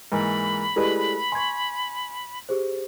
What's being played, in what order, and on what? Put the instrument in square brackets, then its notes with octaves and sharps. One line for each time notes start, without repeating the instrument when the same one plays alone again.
[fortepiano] G#2 E3 A#3 [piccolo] B5
[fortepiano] G#3 A3 B4 [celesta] E4 G4 D5
[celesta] G#5 G#6 [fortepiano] C6 C#6
[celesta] G4 G#4 C5